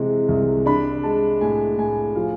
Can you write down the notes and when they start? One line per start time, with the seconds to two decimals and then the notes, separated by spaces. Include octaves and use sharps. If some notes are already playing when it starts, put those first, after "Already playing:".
Already playing: C3 E3 G#3
0.28 C2
0.66 D4 B5
1.03 G#3 A5
1.41 A2 G#5
1.78 A2 G#5
2.16 F3 F5